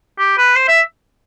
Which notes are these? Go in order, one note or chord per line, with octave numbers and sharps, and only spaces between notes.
G4
B4
C5
E5